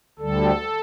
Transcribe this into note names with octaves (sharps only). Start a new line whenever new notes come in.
D2 D3 G3 A4